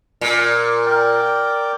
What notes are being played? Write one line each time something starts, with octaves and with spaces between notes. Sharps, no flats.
A#2
A#4 D5 G5